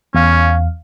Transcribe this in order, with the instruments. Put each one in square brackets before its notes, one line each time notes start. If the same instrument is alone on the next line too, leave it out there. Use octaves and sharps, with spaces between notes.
[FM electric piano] E2 F5 [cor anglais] C#4